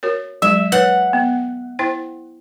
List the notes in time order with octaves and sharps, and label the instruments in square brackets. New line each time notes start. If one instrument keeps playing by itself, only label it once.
[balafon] F#4 A#4 C#5
[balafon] F#3 G#3 [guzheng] E5
[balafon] B4 C#5 [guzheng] F#5
[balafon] B3
E4 C5 G5